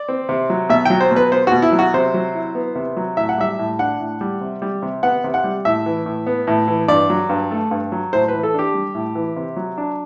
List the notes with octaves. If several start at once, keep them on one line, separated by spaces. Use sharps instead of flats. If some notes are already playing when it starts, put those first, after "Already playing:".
Already playing: D5
C4
C3
F#3
B2 E5
F#3 G5
C5
B2
B4
B3 C5
F#4
B2
E4
F#3
F#4
C3 C5
F#3
E4
B3
C3
F#3
A2 E5
F#5
G3 E5
A2
D4 F#5
A2
G3
C3
G3
C3
B3 F#5
C3
F#5
G3
A2 E5
E3
A2
B3
A2
E3
G2 D5
F#3
G2
A3
G2
F#3
A2 C5
E3 B4
A4
D4 G4
G3
A2
E3
C3
F#3
D4